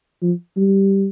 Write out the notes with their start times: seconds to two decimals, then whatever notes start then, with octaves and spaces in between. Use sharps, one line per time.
0.22 F3
0.57 G3